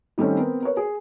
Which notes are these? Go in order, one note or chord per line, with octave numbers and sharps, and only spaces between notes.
D#3 G3 A3 C4 C#4
B3 C4 A#4
A#4 B4 C#5
G#4